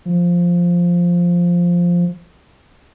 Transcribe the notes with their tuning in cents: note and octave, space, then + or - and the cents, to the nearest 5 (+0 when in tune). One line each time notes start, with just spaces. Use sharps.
F3 +0